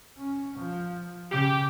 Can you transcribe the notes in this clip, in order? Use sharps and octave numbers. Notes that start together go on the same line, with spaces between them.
C#4
F3
C#3 G4